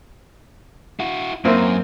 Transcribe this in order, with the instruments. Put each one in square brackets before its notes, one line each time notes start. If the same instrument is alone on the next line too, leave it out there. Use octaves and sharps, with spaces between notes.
[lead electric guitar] E4 F#4
[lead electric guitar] F#2 [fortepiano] A#3 C4 E4